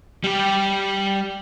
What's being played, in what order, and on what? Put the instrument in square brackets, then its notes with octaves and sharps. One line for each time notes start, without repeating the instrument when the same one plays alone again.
[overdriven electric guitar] G3 G4